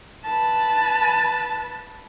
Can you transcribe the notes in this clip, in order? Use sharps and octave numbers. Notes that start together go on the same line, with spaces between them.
B4 A5